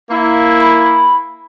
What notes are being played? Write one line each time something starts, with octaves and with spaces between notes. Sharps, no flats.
A#3 E4
B5